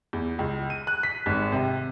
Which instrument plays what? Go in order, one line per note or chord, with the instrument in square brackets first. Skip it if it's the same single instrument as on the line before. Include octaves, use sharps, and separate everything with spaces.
[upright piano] E2
C#2
D#7
F#6
B6
G#1
C3